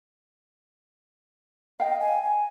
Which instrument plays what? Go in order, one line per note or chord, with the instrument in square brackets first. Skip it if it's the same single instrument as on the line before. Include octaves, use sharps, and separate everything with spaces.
[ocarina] D#5 [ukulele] F5 G5
[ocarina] G#5
G#5